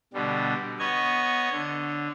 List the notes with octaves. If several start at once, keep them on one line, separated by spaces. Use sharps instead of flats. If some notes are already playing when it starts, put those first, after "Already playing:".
B2 D3 G3
B3 C#5 D#5 G#6
D3